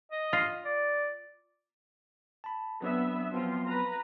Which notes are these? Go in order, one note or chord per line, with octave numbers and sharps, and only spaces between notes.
D#5
F4
D5
A5 B5
F#3 B3 C4 D4 E5
F3 F#3 B3 C4 F4
B4 A#5